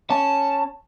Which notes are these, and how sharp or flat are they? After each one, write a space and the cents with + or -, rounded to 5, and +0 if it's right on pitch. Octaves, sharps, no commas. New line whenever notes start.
C#4 +0 A5 +0